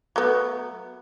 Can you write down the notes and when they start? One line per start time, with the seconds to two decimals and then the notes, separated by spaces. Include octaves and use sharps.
0.16 F#3 A3 B3